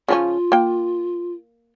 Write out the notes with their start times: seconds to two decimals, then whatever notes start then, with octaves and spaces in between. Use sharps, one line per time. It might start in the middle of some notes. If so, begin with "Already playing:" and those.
0.08 C#3 F3 C#4 F4
0.52 A#3 G5